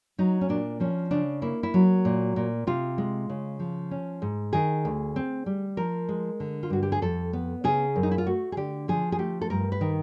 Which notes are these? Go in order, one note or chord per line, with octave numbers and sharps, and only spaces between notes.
F#3 D#4
C#4
A#2 D4
F3 C#4
C#3 D4
A#3 E4
E4
F#3
A#2
A#2
C3 F4
G#3
C#3
F3
C#4
G#2
D#3 G#4
D2
C4
G3
F3 A#4
G#3
D3
F4
G2 F#4
G4
G#4
F2 A4
B3
C#3 G#4
F#2
D#4
E4
F4
A3 F#4
G#4
D3 G4
F3 G#4
G#4
A3 G4
A4
G2 A#4
B4
D#3